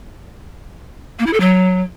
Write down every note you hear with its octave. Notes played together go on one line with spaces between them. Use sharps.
A#3
E4
A4
F#3